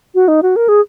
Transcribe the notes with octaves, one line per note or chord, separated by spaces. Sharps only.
F#4
D#4
F#4
A#4
G#4